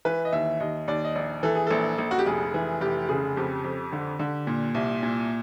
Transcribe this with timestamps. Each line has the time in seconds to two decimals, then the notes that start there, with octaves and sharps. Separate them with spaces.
0.05 E3 B4
0.25 D#5
0.32 D#2 E5
0.60 D#2 D#5
0.88 D#2 D5
1.05 D#5
1.15 A#1 D5
1.43 E3 A4
1.55 G#4
1.67 A#1 A4
1.98 A#1
2.11 F#4
2.19 G4
2.26 F1 G#4
2.54 E3
2.81 F1 G4
3.09 C#3 G#4
3.37 F2 G4
3.64 F2
3.92 D3
4.19 D3
4.47 A#2
4.74 C2
5.03 A#2